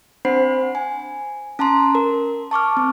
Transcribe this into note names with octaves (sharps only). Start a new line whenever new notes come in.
C4 D4 C5 F#5 B5 C7
G#5
C#4 A5 A#5 C6
A#4
A5 C#6 D6 F6
C4